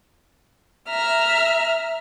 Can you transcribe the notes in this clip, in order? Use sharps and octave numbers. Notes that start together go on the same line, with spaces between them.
E5 A#5 F6